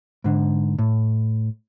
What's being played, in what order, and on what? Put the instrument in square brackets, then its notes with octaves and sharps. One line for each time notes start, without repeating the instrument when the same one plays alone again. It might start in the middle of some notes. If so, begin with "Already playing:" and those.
[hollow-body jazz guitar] G#2 D3
A2